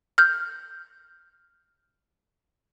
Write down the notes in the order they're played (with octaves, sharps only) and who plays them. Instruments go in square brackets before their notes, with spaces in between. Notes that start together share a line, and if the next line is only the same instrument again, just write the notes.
[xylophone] F6 G6